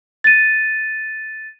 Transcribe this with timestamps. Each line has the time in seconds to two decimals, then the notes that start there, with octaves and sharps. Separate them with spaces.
0.24 A6 D#7